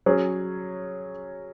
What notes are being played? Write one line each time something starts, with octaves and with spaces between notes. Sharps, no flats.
F#3 C#4 G#4